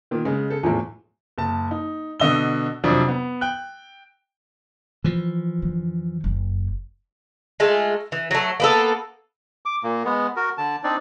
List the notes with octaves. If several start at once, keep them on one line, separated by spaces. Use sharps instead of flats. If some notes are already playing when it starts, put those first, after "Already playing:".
A#2 D#3
C#3 G#3
A4
E2 A2 F3
F#1 A5
D#4
B2 D3 D#5 E6 G7
F2 C3 F3 F#3 D4
B3
G5 F#6
E3 F3
F2 D3
F#1
G#3 A3 F4
E3
F#3 A3
A#3 B3 A4
D6
A#2 A#3
G#3 B3
F#4 A#4
D3 A5
C4 D4 D#4 D5